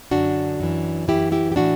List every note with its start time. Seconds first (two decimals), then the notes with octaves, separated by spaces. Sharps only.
0.11 F#2 D3 D4 F#4
0.60 F#2 E3
1.08 F#2 E3 E4 G4
1.32 E4 G4
1.52 G4
1.56 A2 E3 D4 F#4